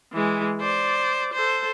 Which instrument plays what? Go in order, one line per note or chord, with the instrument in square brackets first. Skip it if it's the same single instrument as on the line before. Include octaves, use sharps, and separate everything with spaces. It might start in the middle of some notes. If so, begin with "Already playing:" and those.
[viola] E3 G#3
C5 D5
A4 C5